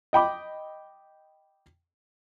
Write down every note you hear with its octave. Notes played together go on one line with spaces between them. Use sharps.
D#5 G5 B5 D6